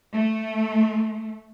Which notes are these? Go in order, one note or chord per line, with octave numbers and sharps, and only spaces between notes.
A3